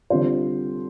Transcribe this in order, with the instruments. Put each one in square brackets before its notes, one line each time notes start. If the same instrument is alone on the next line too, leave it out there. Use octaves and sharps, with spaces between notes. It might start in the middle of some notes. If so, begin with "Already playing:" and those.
[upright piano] D3 G3 C4 F4 C5